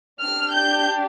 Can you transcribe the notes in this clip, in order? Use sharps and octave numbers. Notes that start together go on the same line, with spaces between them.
D4 G4 F6
G6